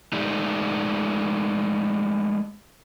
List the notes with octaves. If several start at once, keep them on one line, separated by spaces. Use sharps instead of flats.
G#3 A3 D#4 G4 D5